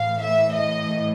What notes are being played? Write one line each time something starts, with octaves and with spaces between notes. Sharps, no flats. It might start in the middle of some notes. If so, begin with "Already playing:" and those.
Already playing: A2 E3 F5
E5
D#5